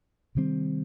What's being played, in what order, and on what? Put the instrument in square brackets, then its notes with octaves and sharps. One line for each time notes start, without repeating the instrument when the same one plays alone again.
[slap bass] C3 D#3 G3 C4